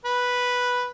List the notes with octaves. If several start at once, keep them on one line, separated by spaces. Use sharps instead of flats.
B4